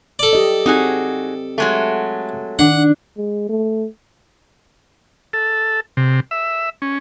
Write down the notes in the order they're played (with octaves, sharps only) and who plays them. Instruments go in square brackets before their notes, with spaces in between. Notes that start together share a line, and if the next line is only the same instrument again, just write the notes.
[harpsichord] A4 D5
[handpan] F#3 G4 D#5
[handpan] C4 [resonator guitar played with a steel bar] D#4 F#4 G#4
[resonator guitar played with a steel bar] F#3 G#3 A3
[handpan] D#3 [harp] D4 [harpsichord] F#5
[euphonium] G#3
A3
[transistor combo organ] A4
C3
E5
C#4